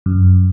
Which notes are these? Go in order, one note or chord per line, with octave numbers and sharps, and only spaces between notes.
F#2